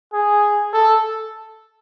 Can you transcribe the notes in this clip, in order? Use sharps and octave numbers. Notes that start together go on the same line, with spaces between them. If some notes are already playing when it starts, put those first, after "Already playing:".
G#4
A4